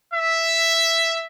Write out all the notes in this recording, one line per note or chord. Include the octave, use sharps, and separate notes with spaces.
E5